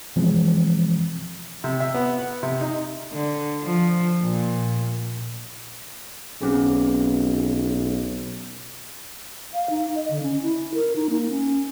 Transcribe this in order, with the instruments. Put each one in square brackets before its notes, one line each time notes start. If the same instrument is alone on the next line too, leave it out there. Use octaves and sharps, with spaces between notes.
[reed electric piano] F#2 B2 E3 F3 G#3 C4
[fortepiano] C3
E5
B3
F#5
C3
D#4
[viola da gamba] D3
F3
A#2
[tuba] B1 [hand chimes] C4 C#4 G#4
[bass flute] F5
D#4
D#5
D3
C#4
E4
A#4
D#4
A#3
C#4